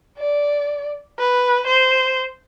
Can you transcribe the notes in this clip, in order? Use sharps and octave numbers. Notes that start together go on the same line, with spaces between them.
D5
B4
C5